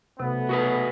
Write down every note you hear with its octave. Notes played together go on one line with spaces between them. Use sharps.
B1 C3 A3 B3
F#4 G#4 B4